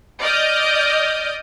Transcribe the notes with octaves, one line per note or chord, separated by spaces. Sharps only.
D5 D#5 D#6 F6 G6